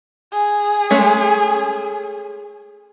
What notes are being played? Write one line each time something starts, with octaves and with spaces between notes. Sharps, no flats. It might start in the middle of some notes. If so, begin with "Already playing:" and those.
G#4
G#3 A3 C#4